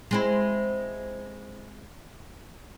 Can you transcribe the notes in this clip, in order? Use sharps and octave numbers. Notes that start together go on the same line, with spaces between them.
G#3 C4 E4